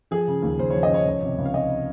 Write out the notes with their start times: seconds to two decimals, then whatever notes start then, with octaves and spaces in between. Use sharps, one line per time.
0.11 F3 G#4
0.28 C#3
0.43 D#2
0.59 C#3 C5
0.70 C#5
0.75 F3
0.83 D#5
0.90 F3 C#5
1.06 C#2
1.22 C3
1.38 C#2
1.45 F5
1.54 C#2 D#5